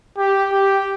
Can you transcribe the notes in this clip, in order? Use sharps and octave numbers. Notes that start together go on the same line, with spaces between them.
G4
G4